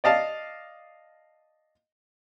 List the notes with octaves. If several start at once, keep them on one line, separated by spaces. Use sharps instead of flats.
D5 D#5 F5 A5